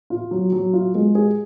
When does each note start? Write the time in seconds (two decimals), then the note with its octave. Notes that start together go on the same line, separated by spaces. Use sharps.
0.10 F4
0.31 F#3
0.52 F#3
0.73 F4
0.95 G#3
1.15 G#4